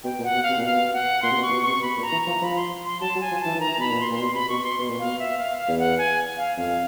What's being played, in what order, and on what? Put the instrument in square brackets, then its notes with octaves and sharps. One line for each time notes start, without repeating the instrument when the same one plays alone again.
[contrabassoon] B2 [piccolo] G5
[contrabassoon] A#2
[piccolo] F#5
[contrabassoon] B2
[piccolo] F5
[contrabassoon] C3
A#2
[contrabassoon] B2 [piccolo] F5
[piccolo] F#5
[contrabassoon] A#2 [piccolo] C6
[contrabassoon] C3
B2
[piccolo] C#6
[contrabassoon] A#2
B2
[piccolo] C#6
[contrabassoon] C3
[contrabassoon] B2 [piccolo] B5
[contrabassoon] A#2
[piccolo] A#5
[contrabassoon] E3
[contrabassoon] F3 [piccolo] A#5
[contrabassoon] F3 [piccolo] B5
[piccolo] C6
C6
[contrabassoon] F#3 [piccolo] A5
[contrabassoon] F#3
[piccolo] G#5
[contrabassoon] F3
[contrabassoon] E3 [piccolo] A5
[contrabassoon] E3
[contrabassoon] D#3 [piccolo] A#5
[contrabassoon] B2 [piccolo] B5
[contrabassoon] A#2
[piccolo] C6
[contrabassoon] A#2
[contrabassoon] B2 [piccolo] C6
[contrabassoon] C3 [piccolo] B5
[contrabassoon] B2 [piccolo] C#6
[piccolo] C6
[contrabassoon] B2
A#2
[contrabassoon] B2 [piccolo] F5
[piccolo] E5
F5
F5
[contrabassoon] E2
[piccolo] F#5
G#5
F5
[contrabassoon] F2 [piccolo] F5